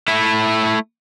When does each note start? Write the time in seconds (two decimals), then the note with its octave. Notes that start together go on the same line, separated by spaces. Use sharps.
0.08 A3 E4